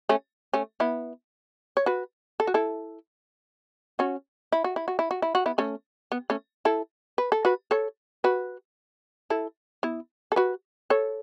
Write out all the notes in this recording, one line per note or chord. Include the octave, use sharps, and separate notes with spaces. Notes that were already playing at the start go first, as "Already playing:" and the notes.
A3 C#4
A3 C#4
B3 E4
C#5
F#4 B4
A4
F#4
E4 A4
C#4 F#4
E4
F#4
E4
F#4
E4
F#4
E4
F#4
B3 E4
A3 C#4
B3
A3 C#4
E4 A4
B4
A4
F#4 B4
A4 C#5
F#4 B4
E4 A4
B3 E4
A4
F#4 B4
A4 C#5